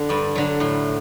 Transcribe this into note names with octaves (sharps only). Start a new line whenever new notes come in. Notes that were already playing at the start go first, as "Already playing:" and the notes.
Already playing: D3
G2 D5
D3 F#3
A2